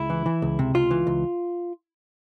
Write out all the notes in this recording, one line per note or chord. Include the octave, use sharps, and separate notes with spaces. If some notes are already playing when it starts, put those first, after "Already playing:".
Already playing: C#2 E4
E3
E3
C#2
C3
C#2 F4
E3
C#2